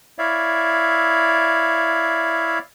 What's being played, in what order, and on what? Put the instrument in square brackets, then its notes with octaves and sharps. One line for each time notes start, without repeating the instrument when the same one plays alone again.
[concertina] E4 C#5 D5 E5 F5